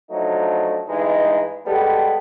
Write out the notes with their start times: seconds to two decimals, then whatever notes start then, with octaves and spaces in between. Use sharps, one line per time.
0.11 F3 F#3 A3 D4 D#4
0.89 G2 E3 G#3 D#4
1.66 G3 G#3 B3 G4 A4